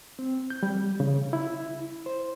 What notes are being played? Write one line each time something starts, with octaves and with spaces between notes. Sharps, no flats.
C4
G6
G3
C#3
E4
C5